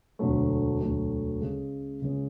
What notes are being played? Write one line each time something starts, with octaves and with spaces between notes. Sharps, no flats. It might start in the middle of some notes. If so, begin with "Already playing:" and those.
E1 D2 D3 F#3 A3
E1 D2 D3 F#3 A3
C#2 C#3 G#3 C#4 G#4
C#2 C#3 G#3 C#4 G#4